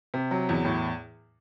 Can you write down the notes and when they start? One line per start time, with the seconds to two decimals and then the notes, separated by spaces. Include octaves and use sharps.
0.14 C3
0.31 F#3
0.49 E2
0.65 A2